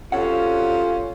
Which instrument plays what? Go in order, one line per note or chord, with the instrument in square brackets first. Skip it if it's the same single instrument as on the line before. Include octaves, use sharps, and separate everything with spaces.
[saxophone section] C3 F#3 C#4 [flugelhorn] F4 [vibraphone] A4 [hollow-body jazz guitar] F#5